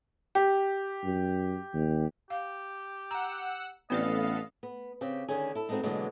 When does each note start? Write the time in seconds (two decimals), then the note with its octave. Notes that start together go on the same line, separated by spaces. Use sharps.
0.35 G4
1.04 F#2
1.74 D#2
2.30 G4 F5
3.11 F#5 A#5 E6
3.90 A1 B3 C4 A4 B4 D5 D#5 F5
4.63 B3
5.01 C#3 C4 G4
5.28 D3 D#3 C#4 G#4
5.55 E4 A4
5.69 G#3 A3 B3 C4 D#4 F#4
5.83 B2 D3 E3 F#3 G#3 A#3